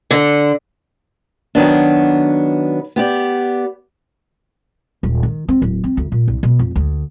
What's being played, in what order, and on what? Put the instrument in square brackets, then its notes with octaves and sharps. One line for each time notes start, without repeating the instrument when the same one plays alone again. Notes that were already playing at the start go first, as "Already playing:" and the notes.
[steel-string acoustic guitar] D3
D#3 F#3 B3 D4
B3 G4 D5
[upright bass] D#1
D#3
C4
D1
C4
D2
A#2
C2
B2
F1
D2